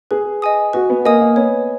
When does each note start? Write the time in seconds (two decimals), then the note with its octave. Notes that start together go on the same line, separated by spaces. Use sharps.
0.11 G#4 B4
0.42 D#5 G#5 D#6
0.73 F#4 B4
0.90 B3
1.05 A#3 D#5 G#5 D#6
1.21 A#3
1.36 B3 C#5